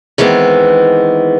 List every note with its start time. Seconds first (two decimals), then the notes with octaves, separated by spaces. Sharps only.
0.18 D#3 E3 G#3 B3 C4